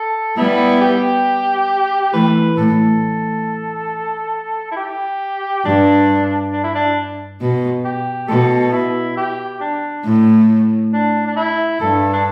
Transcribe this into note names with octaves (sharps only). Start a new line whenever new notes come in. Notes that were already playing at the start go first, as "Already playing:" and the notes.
Already playing: A4
G3 B3 E4
G4
E3 A3 B4
A2 A4
E4
G4
G2 D4
D4
E4
D4
B2
G4
B2 A4
E4
G4
D4
A2
D4
D4
E4
G2 A4
D4